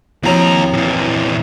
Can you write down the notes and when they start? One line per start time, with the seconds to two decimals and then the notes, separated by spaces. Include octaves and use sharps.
0.24 D#2 F3 C4 E4 F#4 C#5 A#5
0.73 E2 A#2 E3